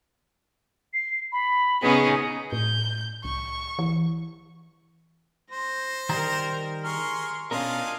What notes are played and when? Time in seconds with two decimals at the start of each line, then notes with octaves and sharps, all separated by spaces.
0.94 C7
1.32 B5
1.82 C#3 B3 C#4 D#4 G#4
2.52 A2 G6
3.24 C2 C#6
3.79 E3
5.51 C5 A#6
6.09 D#3 G3 A#4 A#5 A#6
6.84 G#4 A#4 C6 C#6 F6
7.51 B2 C#4 D4 F4 A#4 D#5 F5 G#5